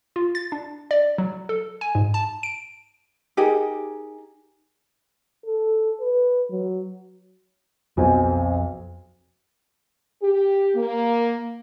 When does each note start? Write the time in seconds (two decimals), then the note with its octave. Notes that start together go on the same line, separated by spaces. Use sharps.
0.16 F4
0.35 A6
0.52 D4
0.91 D5
1.18 F#3
1.49 A4
1.81 G#5
1.95 G#2
2.14 A5
2.43 D7
3.37 D#4 G4 G#4 A#4
5.46 A4
6.01 B4
6.51 F#3
7.97 B1 F2 C4 G#5
10.22 G4
10.75 A#3